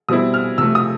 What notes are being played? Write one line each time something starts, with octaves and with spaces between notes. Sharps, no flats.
B2 G3 C4 E4 D#6
F6
C3 F3 A3 E6
D#6